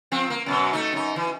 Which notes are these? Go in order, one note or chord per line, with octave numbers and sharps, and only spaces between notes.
F3 C4
A#3
F#2 B2 F#3
A3 D#4
F#2 D#4
E3